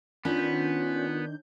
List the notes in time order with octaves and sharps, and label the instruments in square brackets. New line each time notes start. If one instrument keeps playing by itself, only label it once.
[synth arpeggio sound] D#3 D4 G6 [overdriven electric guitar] B3 [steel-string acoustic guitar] C#4 [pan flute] F4